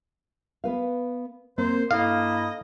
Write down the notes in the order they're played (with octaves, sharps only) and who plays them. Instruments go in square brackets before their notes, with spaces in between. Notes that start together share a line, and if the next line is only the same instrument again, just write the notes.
[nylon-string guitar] B3 B4 F5
[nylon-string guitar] A#3 C4 A#4 [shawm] C5
[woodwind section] G2 A#3 E4 [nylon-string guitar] A4 [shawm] D#5 [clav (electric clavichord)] F5